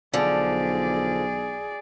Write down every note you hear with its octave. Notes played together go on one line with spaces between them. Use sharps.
B1 D3 F3 G#4 D5